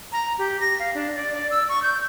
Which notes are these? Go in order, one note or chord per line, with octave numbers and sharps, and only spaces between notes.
A#5
G4
A#6
F5
D4
D5
D5
E6
C#6
G6